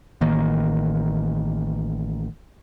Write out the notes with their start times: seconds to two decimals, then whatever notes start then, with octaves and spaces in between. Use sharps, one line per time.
0.21 A1 D#3 A#3